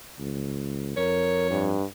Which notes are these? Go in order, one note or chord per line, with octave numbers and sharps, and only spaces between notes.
C#2
F2 A#4 C#5
G2